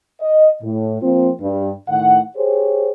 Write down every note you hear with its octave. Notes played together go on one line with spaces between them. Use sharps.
D#5
A2
F3 A#3 C4 F4
G2
A2 D#3 F#5
G4 G#4 C5 C#5